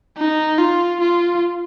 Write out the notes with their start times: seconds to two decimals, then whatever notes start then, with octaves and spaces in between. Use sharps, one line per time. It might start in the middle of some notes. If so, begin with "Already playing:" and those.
0.18 D#4
0.58 F4
1.01 F4